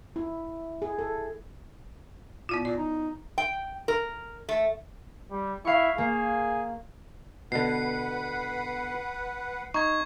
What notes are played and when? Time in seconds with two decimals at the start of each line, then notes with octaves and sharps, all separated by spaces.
0.16 E4
0.82 G#4
0.99 A4
2.49 A#2 B3 E4 F4
2.65 A#2 D5
2.78 D#4
3.38 G5
3.88 A#4
4.49 A3
5.31 G3
5.65 E4 F5 C#6
5.98 A#3 G#4
7.52 B2 D3 B4 F#5 C7
9.74 D#4 C#6 G#6